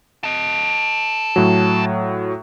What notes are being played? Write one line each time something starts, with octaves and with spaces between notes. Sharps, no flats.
A4 D#5
A2 F#3